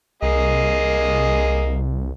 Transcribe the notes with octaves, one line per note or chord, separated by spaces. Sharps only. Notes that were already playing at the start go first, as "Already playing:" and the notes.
C2 A#3 G#4 D#5